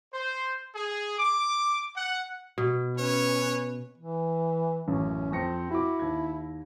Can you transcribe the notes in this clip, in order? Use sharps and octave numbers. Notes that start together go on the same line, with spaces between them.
C5
G#4
D6
F#5
B2
C#4 B4 C#5
E3
A1 F#2 C#4
F2 C4 A#6 C#7
E4 F#4 D6
D#2 G#6